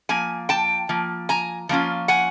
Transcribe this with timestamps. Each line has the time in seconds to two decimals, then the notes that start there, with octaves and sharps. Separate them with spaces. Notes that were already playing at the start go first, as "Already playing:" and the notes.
0.09 F3 A#3 G#5
0.49 G5 A5
0.89 F3 A#3
1.29 G#5 A#5
1.69 F3 A#3 C#4 F4
2.08 F#5 G#5